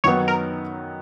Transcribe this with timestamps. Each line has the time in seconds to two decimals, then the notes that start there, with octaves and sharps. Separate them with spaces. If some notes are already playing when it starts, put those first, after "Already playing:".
0.04 F#2 D#3 F#3 B3 D#4 C#5
0.28 A#4